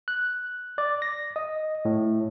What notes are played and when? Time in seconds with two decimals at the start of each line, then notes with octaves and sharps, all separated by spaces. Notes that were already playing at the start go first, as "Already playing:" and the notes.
0.08 F#6
0.78 D5
1.02 A#6
1.36 D#5
1.85 A2